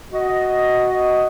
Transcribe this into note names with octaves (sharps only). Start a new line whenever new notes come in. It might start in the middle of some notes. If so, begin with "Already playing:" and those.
F#4 D#5